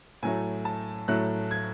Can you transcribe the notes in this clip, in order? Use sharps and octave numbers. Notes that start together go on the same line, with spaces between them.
A2 F#3 A3 G#5
A5
A2 F#3 A3 F#6
G#6